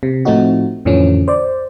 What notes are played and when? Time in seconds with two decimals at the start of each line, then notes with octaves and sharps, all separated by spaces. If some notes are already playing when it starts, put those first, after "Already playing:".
0.03 C3
0.25 A2 F3 A3 C4 D#4 F#4
0.85 F2 A2 D3 E3 F3 C#4
1.28 C5 D5